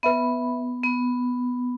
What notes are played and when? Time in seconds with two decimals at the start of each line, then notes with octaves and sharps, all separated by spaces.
0.03 B3 B4 E5 B5
0.84 B3